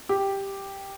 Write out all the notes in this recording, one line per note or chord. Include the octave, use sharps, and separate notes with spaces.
G4